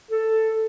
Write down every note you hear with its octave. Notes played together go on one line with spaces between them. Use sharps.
A4